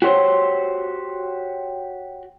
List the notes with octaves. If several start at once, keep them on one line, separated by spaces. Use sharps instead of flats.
F#4 G4 C5 C#5